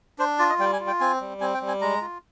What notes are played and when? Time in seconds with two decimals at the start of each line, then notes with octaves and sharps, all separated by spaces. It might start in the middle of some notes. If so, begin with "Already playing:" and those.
0.19 D4 C5
0.39 F4 D5
0.49 D#5
0.59 G3 G5
0.73 G#5
0.80 F4
0.87 G5
1.00 C4 G#5
1.21 G3
1.41 C4 G#5
1.54 G5
1.62 G3
1.68 G#5
1.81 G#3 A#5
2.01 F4